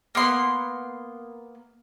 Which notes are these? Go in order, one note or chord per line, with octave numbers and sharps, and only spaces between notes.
A#3 B3 C6